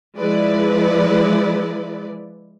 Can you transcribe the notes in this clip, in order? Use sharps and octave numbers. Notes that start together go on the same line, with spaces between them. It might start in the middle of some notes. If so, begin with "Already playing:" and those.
F3 G#3 E4 B4 D5